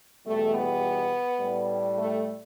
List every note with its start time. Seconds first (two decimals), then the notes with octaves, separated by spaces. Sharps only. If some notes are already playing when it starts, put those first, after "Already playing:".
0.25 E2 B2 G3 A3
0.55 B3
1.40 A2 G3
1.98 A3